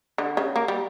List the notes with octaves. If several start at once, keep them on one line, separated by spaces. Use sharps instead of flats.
D3
C#3
A#3
G3